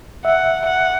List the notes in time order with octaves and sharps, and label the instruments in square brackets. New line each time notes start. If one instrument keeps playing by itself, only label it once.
[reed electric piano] E5 [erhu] F#5
[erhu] F#5